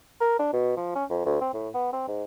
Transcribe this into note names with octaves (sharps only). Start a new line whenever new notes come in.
A#4
D4
B2
F3
C#4
F2
D2
C4
A2
B3
C4
G#2